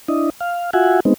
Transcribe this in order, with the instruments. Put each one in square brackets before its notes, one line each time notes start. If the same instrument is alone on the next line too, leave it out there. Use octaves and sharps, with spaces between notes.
[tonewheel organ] D4 E4 D#5
F5
F4 F#4 E5 F#5 G#5
G#3 B3 C4 D#4